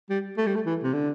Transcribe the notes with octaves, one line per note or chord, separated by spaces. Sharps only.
G3
A3
G3
A3
E3
C3
D3